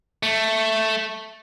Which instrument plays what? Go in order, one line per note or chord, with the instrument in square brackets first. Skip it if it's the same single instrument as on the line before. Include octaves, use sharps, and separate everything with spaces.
[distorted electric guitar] A3